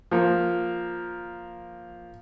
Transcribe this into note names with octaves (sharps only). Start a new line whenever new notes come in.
F3 A#3